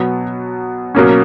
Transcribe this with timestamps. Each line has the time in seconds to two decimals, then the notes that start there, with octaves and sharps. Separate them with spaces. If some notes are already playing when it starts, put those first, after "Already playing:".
Already playing: B2 F#3 B3
0.95 B2 F#3 A#3 C#4